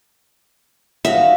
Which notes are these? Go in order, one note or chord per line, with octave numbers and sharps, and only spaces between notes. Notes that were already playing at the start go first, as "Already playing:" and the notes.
D#4 F#4 E5 F5